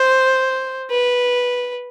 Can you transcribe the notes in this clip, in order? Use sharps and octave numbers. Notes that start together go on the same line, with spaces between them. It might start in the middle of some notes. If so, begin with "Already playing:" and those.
Already playing: C5
B4